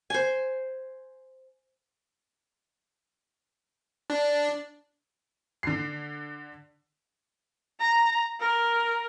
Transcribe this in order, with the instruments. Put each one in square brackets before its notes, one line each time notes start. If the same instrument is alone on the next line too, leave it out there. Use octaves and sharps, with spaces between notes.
[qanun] C5 G#5
[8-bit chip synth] D4
[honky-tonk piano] D3 C7
[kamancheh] A#5
A#4